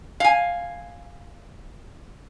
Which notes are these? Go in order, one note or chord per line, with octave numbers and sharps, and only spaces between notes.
F5 G#5